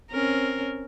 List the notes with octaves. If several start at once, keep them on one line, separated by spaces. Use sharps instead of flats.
C4 C#4 A#4